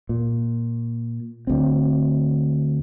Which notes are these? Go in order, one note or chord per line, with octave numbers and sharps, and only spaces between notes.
A#2
D2 C4